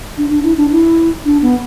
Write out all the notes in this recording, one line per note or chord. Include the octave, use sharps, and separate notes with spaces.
D4
D4
E4
D4
E4
D4
B3